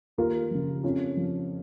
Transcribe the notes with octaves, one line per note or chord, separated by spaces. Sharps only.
D#2 F4 A#4
C#3 F3
F2 C#4 F4
F3